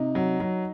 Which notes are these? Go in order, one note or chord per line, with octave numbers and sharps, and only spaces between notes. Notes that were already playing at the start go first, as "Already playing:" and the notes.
Already playing: C3 D#4
F#3
F#3